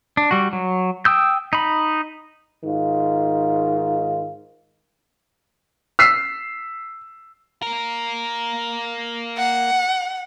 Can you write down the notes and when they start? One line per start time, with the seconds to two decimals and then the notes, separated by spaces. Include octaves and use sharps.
0.17 D4
0.31 G3 F#4
0.53 F#3
1.05 G5 D#6 E6 G6
1.53 D#4 B5
2.64 G#2 D#3 F4
5.99 E6 B6 C7
7.62 A#3 A#4
9.37 F#5